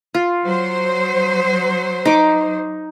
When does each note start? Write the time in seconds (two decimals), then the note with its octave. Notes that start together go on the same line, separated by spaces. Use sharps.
0.14 F4
0.44 F#3 C5
2.05 D#4 D6